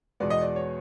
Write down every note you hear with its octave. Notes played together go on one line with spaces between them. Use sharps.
E2 B2 G#3 B3 D5
D#5
D5
C#5